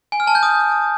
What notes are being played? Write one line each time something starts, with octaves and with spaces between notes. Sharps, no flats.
G#5
F6
A5
G6
D#6